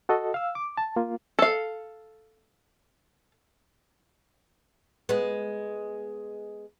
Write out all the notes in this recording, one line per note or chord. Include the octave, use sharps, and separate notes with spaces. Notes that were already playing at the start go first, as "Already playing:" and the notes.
F#4 A4 D#5
F5 E6
D6
A5
A#3 F4
A4 F5
G#3 B3